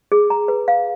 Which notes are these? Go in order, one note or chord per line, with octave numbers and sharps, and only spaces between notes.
G#4
A#5
B4
F5